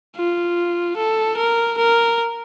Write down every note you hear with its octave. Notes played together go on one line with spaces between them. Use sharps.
F4
A4
A#4
A#4